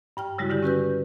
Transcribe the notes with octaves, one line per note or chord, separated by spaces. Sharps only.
G2 G5 F6
C#3 G3 G#3 E4 F#4
D3 G#3 E4 G4
C#4 F#4 B4 G6